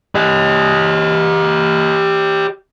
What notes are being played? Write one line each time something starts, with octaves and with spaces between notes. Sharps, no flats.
G4 D#5